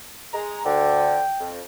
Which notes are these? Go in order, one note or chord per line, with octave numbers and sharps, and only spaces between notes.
G#3 A#5
D2 D3 G5
F2